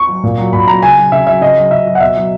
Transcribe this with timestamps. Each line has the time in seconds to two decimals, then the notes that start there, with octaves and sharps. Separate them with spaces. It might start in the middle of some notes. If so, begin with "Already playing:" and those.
Already playing: C#6
0.09 F#3
0.23 A#2
0.38 F#3
0.53 A#2 B5
0.68 F#3 A#5
0.82 C#3 G#5
0.97 F#3
1.12 C#3 E5
1.26 F#3 E5
1.41 C#3 D#5
1.56 F#3
1.71 C#3 E5
1.86 F#3
1.95 F#5
2.00 B2 E5
2.16 F#3